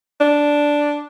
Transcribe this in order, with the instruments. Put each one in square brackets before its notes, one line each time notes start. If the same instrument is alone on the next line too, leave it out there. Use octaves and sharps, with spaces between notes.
[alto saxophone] D4